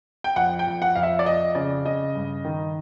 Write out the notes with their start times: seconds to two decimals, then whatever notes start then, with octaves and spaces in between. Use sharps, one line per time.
0.24 G5
0.36 F2 F#5
0.59 G5
0.67 F2
0.82 F#5
0.95 F2 F5
1.03 E5
1.19 D5
1.26 F2 D#5
1.55 C#3 D5
1.85 C#3 D#5
2.15 G2
2.45 D#3